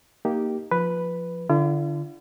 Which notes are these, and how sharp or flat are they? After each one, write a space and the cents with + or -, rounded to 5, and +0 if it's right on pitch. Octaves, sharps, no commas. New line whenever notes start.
A#3 +0 D#4 +0 G4 -10
F3 +0 B4 +0
D3 +0 F4 -45